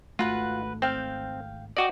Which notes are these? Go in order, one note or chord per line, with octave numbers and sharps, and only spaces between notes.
G#1 A3 F4 F#4 B4 F#5
C4 F5 G5
F#4 D5 D#5 G5 D6